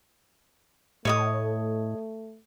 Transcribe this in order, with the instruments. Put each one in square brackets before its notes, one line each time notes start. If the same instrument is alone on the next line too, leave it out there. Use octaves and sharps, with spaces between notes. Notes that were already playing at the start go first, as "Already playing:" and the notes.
[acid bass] A2 [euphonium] A3 [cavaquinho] C#5 D#5 D#6